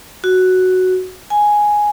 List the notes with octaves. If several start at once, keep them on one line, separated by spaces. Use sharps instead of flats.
F#4
G#5